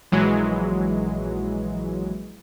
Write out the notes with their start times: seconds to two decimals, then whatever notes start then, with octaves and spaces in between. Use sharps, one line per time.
0.12 A#1 E3 F#3 G#3